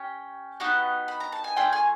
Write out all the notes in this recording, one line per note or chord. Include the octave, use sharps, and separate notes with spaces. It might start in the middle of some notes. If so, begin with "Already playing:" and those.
Already playing: C#4 G4 G5
B3 D#4 F#4 G4 F#5
B5
A#5
A5
G#5
A3 D4 F4 G#4 G5
G#4 G#5